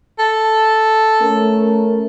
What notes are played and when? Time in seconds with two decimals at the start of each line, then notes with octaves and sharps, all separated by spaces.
0.19 A4
1.21 A3 C#4 A#4